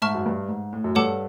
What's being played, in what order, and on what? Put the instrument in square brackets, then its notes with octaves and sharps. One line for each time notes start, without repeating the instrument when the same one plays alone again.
[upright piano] G#2 [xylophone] E5 A5 C#6 F6
[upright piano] F#2
G2
G#2
A2
F#2
[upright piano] G2 [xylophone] A4 C#5 F#5 A5 D6